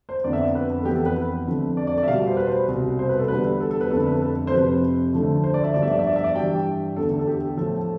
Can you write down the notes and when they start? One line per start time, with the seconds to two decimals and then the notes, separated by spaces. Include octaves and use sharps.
0.09 C5
0.24 F2 D3 F3 B3 D5
0.33 E5
0.41 D5
0.55 B4
0.81 A4
0.85 F2 E3 B3 G4
0.96 A4
1.06 B4
1.46 F2 D3 F3 A3
1.77 D5
1.87 D5
1.98 D5
2.03 E5
2.07 B2 G3 B3 F5
2.28 C5
2.37 B4
2.46 C5
2.68 C2 B2 G3
2.99 C5
3.09 B4
3.19 A4
3.28 E2 D3 G3 B3 B4
3.60 A4
3.71 A4
3.81 B4
3.91 F2 D3 A3 A4
4.06 B4
4.22 A4
4.47 C5
4.52 F2 C3 F3 B4
5.13 D2 D3 F3 A3
5.44 C5
5.54 D5
5.64 E5
5.74 G2 F3 B3 D5
5.83 E5
5.90 D5
5.99 E5
6.07 D5
6.16 E5
6.24 D5
6.35 G2 E3 G3 G5
6.96 E2 D3 A3 A4
7.19 A4
7.27 G4
7.57 A2 F3 A3 A4